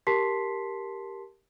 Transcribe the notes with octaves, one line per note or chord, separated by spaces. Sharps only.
G4 A#4 A5 C6 B6 C7